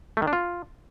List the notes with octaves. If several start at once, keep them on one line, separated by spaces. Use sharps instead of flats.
A3
D#3
D4
F4